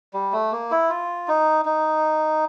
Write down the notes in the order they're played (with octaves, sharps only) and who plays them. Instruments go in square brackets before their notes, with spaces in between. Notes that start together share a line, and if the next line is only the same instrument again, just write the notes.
[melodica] G3
A3
A#3
E4
F4
D#4
D#4